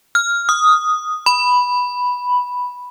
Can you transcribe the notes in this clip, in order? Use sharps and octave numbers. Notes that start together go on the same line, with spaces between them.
F6
D#6
B5